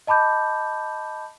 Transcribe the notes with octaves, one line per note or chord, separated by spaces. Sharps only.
D#5 A5 B5 D6 G6